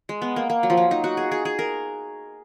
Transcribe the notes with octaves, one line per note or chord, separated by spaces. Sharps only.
G#3
B3
A#3
A#3
F#3
F3
F#3
D#4
F#4
G#4
G#4
G#4
A#4